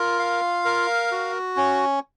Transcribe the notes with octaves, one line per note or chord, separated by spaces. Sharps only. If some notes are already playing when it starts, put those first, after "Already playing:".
Already playing: F4 A#4
F5
A#4
F#4
C#4